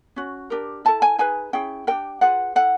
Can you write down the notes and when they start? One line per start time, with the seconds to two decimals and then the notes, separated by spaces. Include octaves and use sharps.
0.16 C#4 F#4
0.50 D4 G4 A#4
0.85 E4 A4 A5
1.02 G#5
1.18 D#4 G#4 B4 G#5
1.53 C#4 E4 G#4 G5
1.87 D4 G4 A#4 G5
2.21 F4 G#4 B4 F#5
2.55 E4 A4 F#5